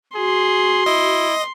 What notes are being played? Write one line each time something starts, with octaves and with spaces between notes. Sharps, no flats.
F#4 G#4 C6
E4 D#5